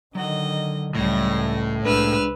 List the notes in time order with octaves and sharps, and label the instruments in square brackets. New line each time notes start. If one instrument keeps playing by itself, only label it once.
[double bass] D3 D#3 [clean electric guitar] F#3 F#5 [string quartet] D#5
[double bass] C#2 [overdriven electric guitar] A2 [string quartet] G3 A#6
[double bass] C2 [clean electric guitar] G#3 D4 [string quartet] B4 E6 F6